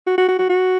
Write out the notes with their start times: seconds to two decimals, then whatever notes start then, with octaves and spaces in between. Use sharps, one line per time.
0.07 F#4
0.18 F#4
0.28 F#4
0.39 F#4
0.49 F#4